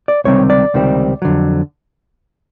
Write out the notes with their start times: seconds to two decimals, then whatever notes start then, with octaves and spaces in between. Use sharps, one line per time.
0.08 D5
0.24 C#2 C3 D#3 G3 C4 C#5
0.50 D5
0.74 C#2 C3 D#3 G3 C4
1.22 F2 D3 F#3